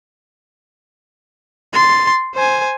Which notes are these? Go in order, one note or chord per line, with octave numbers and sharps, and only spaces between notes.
C6 A6
C5 G#5